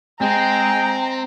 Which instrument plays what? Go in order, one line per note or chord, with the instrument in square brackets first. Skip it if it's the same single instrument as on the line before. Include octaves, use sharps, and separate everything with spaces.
[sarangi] G#3 [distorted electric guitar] C4 [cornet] G5 [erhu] A#5